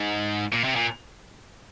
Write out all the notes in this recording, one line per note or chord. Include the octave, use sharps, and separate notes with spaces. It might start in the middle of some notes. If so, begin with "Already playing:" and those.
Already playing: G#2
A#2
C3
A#2